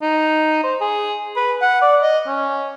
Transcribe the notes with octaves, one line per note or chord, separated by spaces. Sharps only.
D#4
C5
G#4
B4
F#5
D5
D#5
C#4